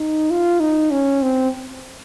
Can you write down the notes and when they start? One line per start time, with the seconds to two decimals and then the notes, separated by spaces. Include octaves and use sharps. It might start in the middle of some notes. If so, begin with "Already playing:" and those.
Already playing: D#4
0.30 F4
0.60 D#4
0.91 C#4
1.22 C4